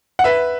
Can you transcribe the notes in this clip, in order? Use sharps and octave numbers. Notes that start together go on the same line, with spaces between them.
F#5
B4 E5